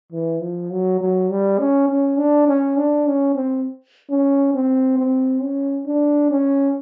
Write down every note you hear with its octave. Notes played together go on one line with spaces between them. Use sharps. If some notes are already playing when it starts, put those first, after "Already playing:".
E3
F3
F#3
F#3
G3
C#4
C#4
D4
C#4
D4
C#4
C4
C#4
C4
C4
C#4
D4
C#4